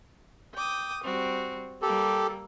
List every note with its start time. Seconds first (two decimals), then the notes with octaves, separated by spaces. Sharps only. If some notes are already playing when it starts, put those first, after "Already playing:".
0.55 G5 D6 D#6
1.03 G3 C4 F#4
1.82 G3 A#3 G4 A4